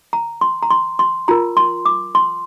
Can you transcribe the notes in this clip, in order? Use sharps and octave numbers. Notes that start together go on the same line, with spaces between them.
A#5
C6
A#5
C6
C6
F4 A#4 A#5
C6
D6
C6